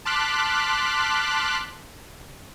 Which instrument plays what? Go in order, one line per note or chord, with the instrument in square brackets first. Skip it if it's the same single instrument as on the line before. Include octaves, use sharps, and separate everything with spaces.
[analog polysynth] A5 C6 D6 F6 F#6 B6